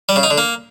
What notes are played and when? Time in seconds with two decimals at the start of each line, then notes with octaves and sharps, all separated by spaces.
0.09 G3
0.16 C#3
0.23 D#4
0.30 D3
0.38 A#3